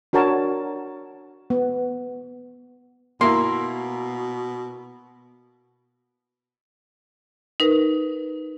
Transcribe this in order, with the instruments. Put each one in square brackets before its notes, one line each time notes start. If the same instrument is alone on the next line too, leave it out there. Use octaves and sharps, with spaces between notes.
[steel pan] D4 F#4 A#4 C#5 A5
B3
[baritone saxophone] B2 [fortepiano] A#3 E4 [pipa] C6
[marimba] D#4 A#4 B4